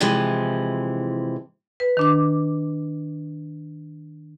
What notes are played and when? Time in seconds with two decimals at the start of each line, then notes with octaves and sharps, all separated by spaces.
0.01 C3 E3 F3 G#3
1.80 B4
1.97 D#3 D4 D6